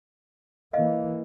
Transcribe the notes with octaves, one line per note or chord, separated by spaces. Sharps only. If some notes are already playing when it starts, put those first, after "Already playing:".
E3 A#3 D#5 F5